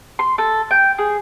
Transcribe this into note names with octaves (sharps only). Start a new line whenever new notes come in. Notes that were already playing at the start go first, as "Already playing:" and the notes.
C6
A4
G5
G#4